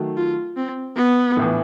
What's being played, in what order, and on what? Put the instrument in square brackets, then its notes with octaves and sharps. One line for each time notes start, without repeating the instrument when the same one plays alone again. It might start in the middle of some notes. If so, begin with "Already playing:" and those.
Already playing: [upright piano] D#3 F#3 A3
[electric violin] F4
C4
B3
[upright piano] A#1 A2 E3